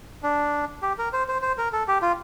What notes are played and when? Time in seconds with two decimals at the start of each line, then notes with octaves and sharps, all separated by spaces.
0.23 D4
0.82 G4
0.98 A#4
1.13 C5
1.28 C5
1.42 C5
1.58 A#4
1.73 A4
1.88 G4
2.02 F4